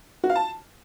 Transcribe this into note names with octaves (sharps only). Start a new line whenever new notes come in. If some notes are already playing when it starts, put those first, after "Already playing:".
F#4
F5
A5